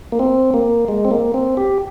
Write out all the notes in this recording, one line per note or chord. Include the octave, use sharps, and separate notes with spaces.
A#3
C4
A#3
G#3
C4
A#3
C4
G4